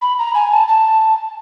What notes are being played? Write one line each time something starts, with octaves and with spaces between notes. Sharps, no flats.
B5
A#5
G#5
A5
A5